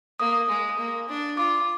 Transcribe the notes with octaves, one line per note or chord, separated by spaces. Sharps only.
A#3 D#6
G#3
A#3
D4
F4 D6